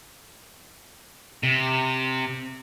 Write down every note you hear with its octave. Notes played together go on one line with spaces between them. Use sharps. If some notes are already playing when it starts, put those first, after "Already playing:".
C3